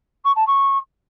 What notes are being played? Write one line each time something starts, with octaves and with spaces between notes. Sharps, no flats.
C#6
A5
C#6